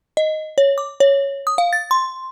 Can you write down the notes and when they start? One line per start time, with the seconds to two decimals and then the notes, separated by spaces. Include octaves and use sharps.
0.17 D#5
0.58 C#5
0.78 D6
1.00 C#5
1.47 D#6
1.58 F5
1.73 A6
1.91 C6